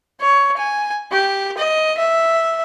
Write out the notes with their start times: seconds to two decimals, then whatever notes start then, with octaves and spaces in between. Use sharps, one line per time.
0.21 C#5
0.58 G#5
1.12 G4
1.58 D#5
1.98 E5